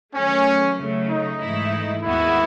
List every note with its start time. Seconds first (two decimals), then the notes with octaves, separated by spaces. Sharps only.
0.15 D#3 F#3 A3 C#4
0.78 C#3 F#3 A3
1.09 D#4
1.41 G#2 E3 A3 E4
2.02 D#2 D#3 G#3 B3 E4 F#4